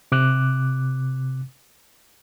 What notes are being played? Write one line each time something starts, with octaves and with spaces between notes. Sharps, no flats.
C3 D6 F#6